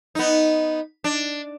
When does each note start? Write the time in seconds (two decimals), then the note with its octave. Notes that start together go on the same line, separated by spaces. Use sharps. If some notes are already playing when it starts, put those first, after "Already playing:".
0.15 B3 D#4
1.04 D4